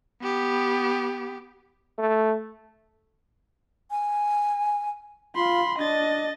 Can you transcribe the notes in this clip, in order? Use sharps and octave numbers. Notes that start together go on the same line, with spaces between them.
B3 G4
A3
G#5
F4 B5 C6
D4 D#5 A6